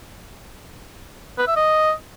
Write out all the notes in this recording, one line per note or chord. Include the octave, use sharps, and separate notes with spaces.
B4
E5
D#5